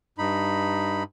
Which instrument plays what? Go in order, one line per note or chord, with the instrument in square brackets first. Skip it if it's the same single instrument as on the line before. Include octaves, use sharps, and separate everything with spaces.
[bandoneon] G2 D#4 B5